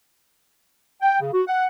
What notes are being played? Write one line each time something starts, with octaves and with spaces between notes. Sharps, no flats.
G5
C#3
F#4
F#5